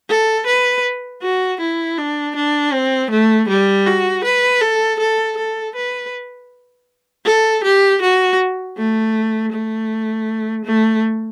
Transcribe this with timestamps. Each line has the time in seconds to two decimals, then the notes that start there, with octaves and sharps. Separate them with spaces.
0.09 A4
0.47 B4
1.22 F#4
1.60 E4
1.98 D4
2.36 D4
2.73 C4
3.11 A3
3.49 G3
3.86 F#4
4.24 B4
4.61 A4
4.99 A4
5.37 A4
5.75 B4
7.25 A4
7.64 G4
8.01 F#4
8.77 A3
9.52 A3
10.65 A3